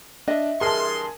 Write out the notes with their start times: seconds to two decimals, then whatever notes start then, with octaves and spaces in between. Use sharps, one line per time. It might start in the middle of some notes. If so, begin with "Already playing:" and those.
0.28 D4 D#5 E5
0.61 G2 E3 G#4 A#4 A5 C6